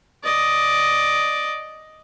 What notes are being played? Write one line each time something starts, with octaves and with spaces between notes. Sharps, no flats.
D5 D#5